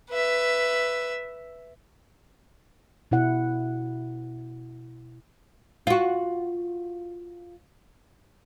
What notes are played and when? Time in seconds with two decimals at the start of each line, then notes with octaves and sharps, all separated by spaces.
0.11 B4 E5
3.11 B2 E4 F#5
5.87 F4 F#4